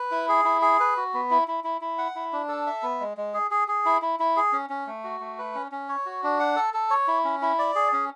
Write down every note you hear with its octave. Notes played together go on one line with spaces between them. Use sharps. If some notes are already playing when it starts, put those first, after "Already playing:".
Already playing: B4
E4
G#4
E4
G#4
B4
F#4
B3
E4
E4
E4
E4
F#5
E4
D4
A4
E5
B3
G#3
G#3
G#4
G#4
G#4
E4
E4
E4
G#4
C#4
C#4
A3
F#4
A3
B4
C#4
C#4
C#5
F#4
D4
F#5
A4
A4
C#5
E4
C#4
E4
D5
G#4
C#4